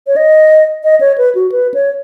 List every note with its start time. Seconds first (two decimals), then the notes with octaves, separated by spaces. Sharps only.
0.07 C#5
0.16 D#5
0.84 D#5
1.01 C#5
1.18 B4
1.35 F#4
1.52 B4
1.74 C#5